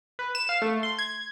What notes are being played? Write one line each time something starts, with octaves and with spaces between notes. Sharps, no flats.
B4
E7
F5
A3
C6
G#6